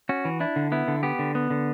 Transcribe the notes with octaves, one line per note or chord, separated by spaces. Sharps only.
C#4 F#4
E3
D4 E4
D3
B3 E4
D3
B3 G4
D3
B3
D3